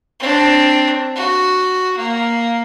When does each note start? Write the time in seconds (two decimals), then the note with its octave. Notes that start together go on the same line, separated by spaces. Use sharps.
0.20 C4 D4
1.16 F#4
1.98 A#3